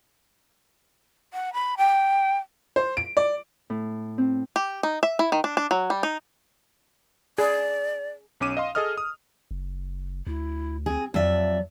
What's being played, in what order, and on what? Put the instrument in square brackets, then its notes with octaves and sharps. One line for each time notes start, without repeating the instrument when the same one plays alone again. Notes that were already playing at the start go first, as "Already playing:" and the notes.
[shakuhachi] F#5
B5
G5
[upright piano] C5
D7
D5
[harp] A2
C4
[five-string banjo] G4
D#4
E5
E4
D#3
D4
D4
F#3
G3
D#4
[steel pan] G#4 [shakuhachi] D5
[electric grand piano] B1 C#4 D6 D#7 E7
D#5 F5 C6
G#4 A4 D#5 D#6 F6
D#6
[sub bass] F#1
[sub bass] D2 [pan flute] E4
[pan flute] C4 [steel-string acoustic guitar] G#4
[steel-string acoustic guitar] F2 E5 [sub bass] F#3 [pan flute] D5